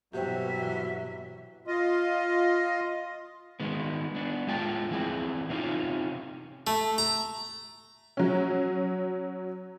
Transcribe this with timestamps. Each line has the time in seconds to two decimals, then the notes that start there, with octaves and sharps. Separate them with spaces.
0.13 G2 B2 E3 F#3 G4 C5 E5 G5
1.67 F4 D#5
3.60 D#3 G#3 B3
4.15 B3 D4
4.47 A2 G#3 F4 G5 A5
4.91 E3 C4 E4 G#4
5.49 C3 A#3 C#4 D#4 F4
6.67 A3
6.98 A#5
8.17 F#3 C#4